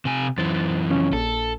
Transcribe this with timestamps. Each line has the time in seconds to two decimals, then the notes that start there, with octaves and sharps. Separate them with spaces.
0.05 C3 G#5
0.38 F#2 E3 C5 A6
0.90 C#3 F3 C#4
1.13 A#1 A4